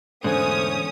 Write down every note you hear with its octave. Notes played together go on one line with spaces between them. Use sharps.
E2 G#2 D3 A3 C#4 C5 G#5 D#6